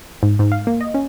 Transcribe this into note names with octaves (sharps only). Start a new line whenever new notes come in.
G#2
G#2
F5
A#3
D#5
C#4